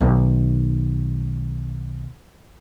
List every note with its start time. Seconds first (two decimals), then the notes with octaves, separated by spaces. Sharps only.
0.01 B1 D#3